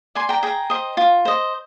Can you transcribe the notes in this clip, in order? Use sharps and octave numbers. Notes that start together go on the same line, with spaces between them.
D5 G#5 C6
G5 A#5
G#4 G5 A#5
C5 D#5
F4
C5 D#5